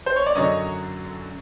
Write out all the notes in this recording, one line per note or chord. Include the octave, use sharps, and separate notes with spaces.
C5
C#5
D5
F#2 D3 F#3 C#5 D#5